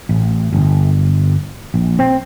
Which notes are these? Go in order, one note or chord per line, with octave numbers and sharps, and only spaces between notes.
A1
G1
A#1
C4